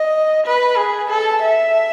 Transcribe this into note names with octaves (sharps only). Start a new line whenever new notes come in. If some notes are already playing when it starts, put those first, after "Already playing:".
Already playing: D#5
B4
G#4
A4
E5